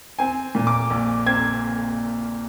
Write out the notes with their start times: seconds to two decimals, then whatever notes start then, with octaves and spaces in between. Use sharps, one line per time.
0.19 C4 G#5
0.55 A#2
0.67 D6
0.90 A#1
1.26 C4 G#6